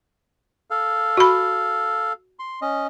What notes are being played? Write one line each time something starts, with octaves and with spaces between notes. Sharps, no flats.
A4 F5
F#4 B5
C6
C#4 D#5